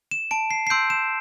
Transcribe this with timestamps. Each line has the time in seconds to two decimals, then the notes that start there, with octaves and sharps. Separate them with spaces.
0.11 E7
0.31 A5 D7
0.51 C7
0.67 C7
0.70 C6 E6 G6 D7
0.90 E7